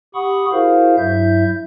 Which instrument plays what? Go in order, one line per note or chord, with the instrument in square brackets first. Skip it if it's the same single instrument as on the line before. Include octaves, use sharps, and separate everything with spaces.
[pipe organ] G4 F#5 B5 C#6 D#6
E4 F#4 G#4 A#4 C5 F5
G2 F#3 E4 E5 G6